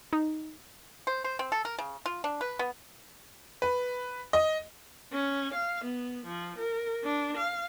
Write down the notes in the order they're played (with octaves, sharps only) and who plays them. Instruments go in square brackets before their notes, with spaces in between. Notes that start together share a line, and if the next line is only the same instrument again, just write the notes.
[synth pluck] D#4
[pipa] C5
C5
C4
A4
A#4
C#3
F4
D4
B4
B3
[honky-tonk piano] B4
D#5
[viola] C#4
F5
B3
F3
A#4
D4
F5